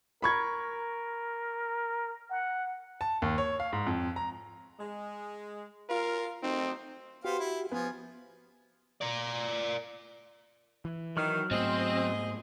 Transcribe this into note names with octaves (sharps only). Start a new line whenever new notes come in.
A#4 B5 C#6 G#6
F#5
A5
D#2
C#5
F5
G#2
F2
A#5
G#3
F4 A#4 F5
F#3 A3 C4 D#4
B3 F#4 G4 C5 F5
E4
F3 B3 G#5
A#4 D5
E3
D#3 F#3 C#6 F6
G#2 A3 B3 C4 G#4 C5 D#5